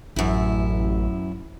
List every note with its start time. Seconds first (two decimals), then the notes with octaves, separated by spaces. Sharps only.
0.16 A1 F#2 E4